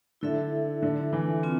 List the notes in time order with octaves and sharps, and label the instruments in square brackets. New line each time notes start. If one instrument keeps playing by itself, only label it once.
[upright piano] D3 [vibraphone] E4 A4 E5
[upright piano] D3
E3
[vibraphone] C4 F4